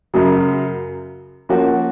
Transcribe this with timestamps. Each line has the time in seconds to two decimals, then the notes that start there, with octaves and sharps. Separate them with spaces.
0.14 F#2 C#3 F#3
1.49 F3 A#3 C#4 F#4